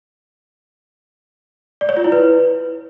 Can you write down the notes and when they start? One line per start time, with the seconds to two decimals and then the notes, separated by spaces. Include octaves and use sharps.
1.81 D5
1.89 C#5
1.97 F4
2.04 E4
2.12 B4